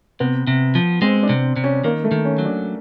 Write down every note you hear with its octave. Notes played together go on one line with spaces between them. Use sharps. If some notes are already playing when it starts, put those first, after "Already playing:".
C3 B3
C3
F3
G#3 C4
D4
C3
C3
C#4
D#3 A#3
A3
D#3
C#4
F#3
D4